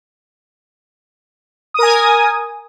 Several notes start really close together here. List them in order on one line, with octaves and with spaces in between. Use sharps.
D#6 A#4 G#5